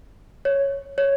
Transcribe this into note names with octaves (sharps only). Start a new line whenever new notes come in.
C#5
C#5